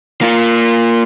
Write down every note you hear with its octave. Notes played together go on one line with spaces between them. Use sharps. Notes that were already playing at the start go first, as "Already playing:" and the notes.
A#3 F4